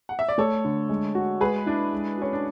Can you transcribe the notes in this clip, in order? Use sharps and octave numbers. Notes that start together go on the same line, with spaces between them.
F#5
E5
D5
A3 A4 C#5
D3
G#3
F#4
G#3 G#4 B4
D4 E4
G#3
C#4 F#4
D4